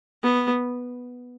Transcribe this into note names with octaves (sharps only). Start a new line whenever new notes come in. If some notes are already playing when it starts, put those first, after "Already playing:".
B3